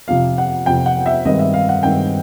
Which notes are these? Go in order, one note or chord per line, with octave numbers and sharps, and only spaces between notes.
F2 C3 F3 F5
F#5
F2 C3 F3 G5
F#5
E5
G2 D#3 G#3 C4 D#5
E5
F5
F#5
G2 D#3 G#3 C4 G5